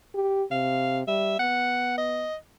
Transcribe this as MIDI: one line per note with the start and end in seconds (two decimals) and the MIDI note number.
0.15 0.43 67
0.51 1.03 48
0.51 0.99 77
1.08 1.37 55
1.08 1.38 76
1.40 2.28 59
1.40 1.94 78
1.98 2.36 75